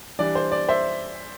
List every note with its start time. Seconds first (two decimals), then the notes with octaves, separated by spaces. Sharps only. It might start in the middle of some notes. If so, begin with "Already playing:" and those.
0.19 E3 G3 D4 D5
0.35 C5
0.52 D5
0.69 C5 E5